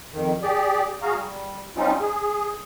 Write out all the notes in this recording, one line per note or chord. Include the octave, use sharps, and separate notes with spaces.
F2 D#3
G4 G#4 D5
F#4 G#4 F5 A#5
G3
G3 C4 C#4 D#4 F4
G#4